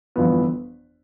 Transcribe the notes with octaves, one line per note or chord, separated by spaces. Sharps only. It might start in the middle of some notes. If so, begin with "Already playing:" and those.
G1 F2 E3 B3